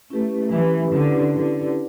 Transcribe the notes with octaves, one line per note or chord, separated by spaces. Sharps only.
A3 C#4 E4 G4 B4
E3 C#4 E4 G4 B4
D3 C#4 E4 G4 B4
D3 C#4 E4 G4 B4